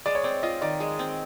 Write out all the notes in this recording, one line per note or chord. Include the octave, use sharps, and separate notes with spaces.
G#3 D5
C#5
C4 D5
F4 D#5
D#3 D5
G#3
C4